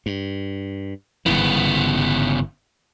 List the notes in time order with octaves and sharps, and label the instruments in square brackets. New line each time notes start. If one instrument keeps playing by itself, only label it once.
[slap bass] G2
[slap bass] G1 G#2 E3 [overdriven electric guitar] C#3 B3